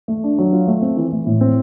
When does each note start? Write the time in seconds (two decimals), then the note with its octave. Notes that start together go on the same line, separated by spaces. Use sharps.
0.08 A3
0.24 D4
0.38 F#3
0.53 F4
0.67 A3
0.82 C4
0.97 E3
1.12 A3
1.26 A2
1.41 C4